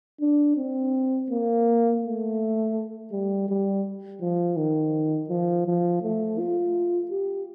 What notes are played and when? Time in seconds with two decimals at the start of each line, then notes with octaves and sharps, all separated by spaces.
0.21 D4
0.57 C4
1.31 A#3
2.03 A3
3.12 G3
3.49 G3
4.21 F3
4.57 D#3
5.30 F3
5.66 F3
6.03 A3
6.39 F4
7.12 G4